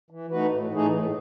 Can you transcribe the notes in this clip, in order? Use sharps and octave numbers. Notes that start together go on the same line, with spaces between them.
E3
A3 D#4 F#4 B4
A2
E3 A3 D#4 G#4
A2